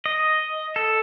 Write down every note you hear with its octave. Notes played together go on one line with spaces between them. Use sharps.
D#5
A4